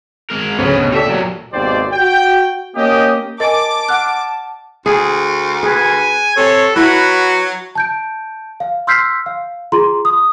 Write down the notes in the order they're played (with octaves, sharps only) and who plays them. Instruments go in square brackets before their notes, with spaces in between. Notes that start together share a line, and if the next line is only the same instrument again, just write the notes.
[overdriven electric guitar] G#3 A#4
[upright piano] D2 C#3 [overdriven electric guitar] B3 C#4
[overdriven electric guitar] B2
[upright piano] G4 A4 D5 [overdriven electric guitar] C#5 E5
[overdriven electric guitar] A#2 F#3
[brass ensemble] G#1 D#2 B2 G4 C5 D5
F#4 G5
A#3 C#4 G4 D#5
[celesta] A#4 A6 [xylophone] D#5 G#5 [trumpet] A5 [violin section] D6
[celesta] F#5 F6 [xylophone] F#6
[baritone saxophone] D2 [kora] G#4
[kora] G#4 [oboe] B4 [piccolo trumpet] G#5
[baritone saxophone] C3 [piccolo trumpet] A4 [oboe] C#5
[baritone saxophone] F#3 [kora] E4 [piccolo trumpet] F#4 [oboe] B4
[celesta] A5 G6 D7
F5
C6 E6 F6 G6 B6 C7
F5
F4 G#4 A#5 C6
D#6